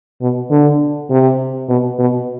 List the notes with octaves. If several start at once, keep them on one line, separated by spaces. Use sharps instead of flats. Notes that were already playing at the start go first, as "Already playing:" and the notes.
B2
D3
C3
B2
B2